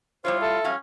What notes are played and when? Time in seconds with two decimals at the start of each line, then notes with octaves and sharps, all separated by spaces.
0.25 G3 E4 F4 C5 C#5
0.42 A4 E5
0.64 F#3 G3 C#4 F5